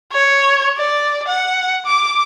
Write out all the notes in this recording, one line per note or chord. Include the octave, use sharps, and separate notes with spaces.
C#5
D5
F#5
D6